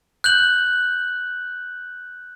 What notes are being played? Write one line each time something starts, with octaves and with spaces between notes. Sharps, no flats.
F#6 G6 F#7